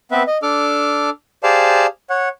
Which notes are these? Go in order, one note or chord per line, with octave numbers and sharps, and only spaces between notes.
B3 C4 B4 E5
D#5
D4 A4 D6 F6
G4 G#4 C5 D5 F5 A5
C#5 F#5